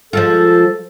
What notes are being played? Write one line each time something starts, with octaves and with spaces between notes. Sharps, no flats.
F3 G#3 F4 A4